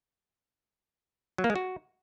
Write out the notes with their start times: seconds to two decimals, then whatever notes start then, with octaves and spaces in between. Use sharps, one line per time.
1.38 F#3
1.44 A#3
1.50 G#3
1.56 F#4